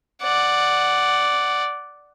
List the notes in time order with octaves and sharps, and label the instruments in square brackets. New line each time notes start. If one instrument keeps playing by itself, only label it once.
[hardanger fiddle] D5 F#5